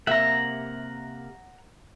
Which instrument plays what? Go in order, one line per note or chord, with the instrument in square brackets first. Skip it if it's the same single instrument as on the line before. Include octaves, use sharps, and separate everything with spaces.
[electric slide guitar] C3 A#3 [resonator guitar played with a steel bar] E5 [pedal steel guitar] F#5 A#5